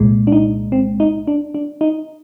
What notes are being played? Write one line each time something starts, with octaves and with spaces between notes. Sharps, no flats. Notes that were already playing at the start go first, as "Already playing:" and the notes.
Already playing: C2 A#2 G#3
D4
D#4
C4
D#4
D4
D4
D#4